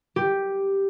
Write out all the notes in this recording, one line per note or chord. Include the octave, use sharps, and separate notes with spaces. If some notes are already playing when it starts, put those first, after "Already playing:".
G4